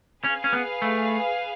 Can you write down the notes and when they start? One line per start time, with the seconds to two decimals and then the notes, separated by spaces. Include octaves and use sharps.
0.24 C#4 G#4 B4 F5
0.44 C#4
0.53 B3
0.82 A3